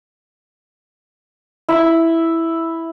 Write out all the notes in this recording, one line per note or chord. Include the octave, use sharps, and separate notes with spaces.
E4